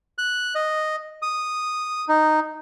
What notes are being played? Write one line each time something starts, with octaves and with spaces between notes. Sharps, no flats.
F#6
D#5
D#6
D#4